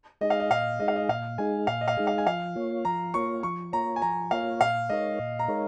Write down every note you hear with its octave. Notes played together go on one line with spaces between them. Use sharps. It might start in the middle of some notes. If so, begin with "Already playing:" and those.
G#3 D#4 G#4 D#5
F5
D#5
A#2 F5
G#3 D#4 G#4 D#5
F5
D#5
A#2 F5
G#3 D#4 G#4 G#5
A#2 F5
D#5
F5
G#3 D#4 G#4
F5
G#5
F3 F5
A#3 F4 C#5
F3 A#5
A#3 F4 C#5 C#6
F3 C#6
A#3 F4 C#5 A#5
G#5
F3 A#5
A#3 F4 C#5 F5
A#2 F5
G#3 D#4 A#4 C#5 D#5
A#2
A#5
G#3 D#4 A#4 C#5